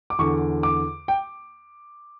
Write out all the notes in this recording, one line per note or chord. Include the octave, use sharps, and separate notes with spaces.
D6
E2 D3 C#6
D6
G5